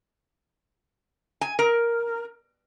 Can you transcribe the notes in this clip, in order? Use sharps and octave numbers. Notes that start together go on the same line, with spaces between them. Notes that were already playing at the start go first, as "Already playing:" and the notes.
G#5
A#4